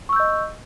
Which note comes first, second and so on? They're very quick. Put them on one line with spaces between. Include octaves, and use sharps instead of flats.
C#6 E6 G6 D#5